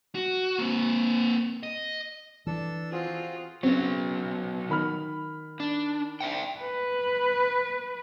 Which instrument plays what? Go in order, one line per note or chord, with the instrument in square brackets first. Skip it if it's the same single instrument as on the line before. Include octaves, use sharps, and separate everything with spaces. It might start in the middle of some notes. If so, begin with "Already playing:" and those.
[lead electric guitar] F#4
A#3 C4
D#5
[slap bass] E3 [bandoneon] D4 A4 E6
[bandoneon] C4 F#4 G#4 [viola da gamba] F4
[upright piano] C#3 C4 [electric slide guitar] F#3 B3
[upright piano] D#3 B5 F6
[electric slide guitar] D4
D5 E5 G5
[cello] B4